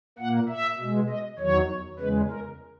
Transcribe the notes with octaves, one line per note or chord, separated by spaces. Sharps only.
A#2 A#3 F#5
E5
B2 G#3
D#5
E2 D#3 F#3 C#5
E2 C#3 G#3 B4
A#4